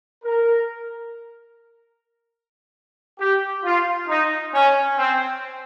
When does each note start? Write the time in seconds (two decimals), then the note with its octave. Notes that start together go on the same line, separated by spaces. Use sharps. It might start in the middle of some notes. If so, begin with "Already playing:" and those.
0.24 A#4
3.20 G4
3.65 F4
4.08 D#4
4.54 C#4
4.98 C4